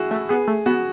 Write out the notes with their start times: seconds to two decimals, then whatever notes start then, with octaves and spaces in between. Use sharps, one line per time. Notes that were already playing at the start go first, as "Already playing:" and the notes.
Already playing: E4 F#4 G#4
0.11 A3
0.29 B3 G#4
0.48 A3
0.66 B3 F#4